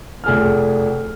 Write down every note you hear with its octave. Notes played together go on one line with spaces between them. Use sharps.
F1 G#4 F6